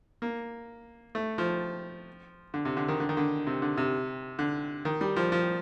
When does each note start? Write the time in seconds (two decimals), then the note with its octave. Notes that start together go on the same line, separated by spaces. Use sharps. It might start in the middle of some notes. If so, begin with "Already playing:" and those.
0.22 A#3
1.15 A3
1.38 F3
2.54 D3
2.65 C3
2.77 D3
2.88 D#3
3.00 D3
3.09 D#3
3.17 D3
3.47 C3
3.62 D3
3.77 C3
4.39 D3
4.85 D#3
5.01 G3
5.16 F3
5.32 F3